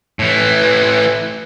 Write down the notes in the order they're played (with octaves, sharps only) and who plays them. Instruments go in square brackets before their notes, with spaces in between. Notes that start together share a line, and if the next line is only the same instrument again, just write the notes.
[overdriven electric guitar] A2 E3